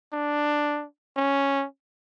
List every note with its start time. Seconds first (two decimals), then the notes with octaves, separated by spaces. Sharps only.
0.13 D4
1.17 C#4